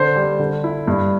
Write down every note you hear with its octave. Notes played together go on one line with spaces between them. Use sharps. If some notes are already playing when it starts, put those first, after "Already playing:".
Already playing: D3 C5
G3
D3
E4
G2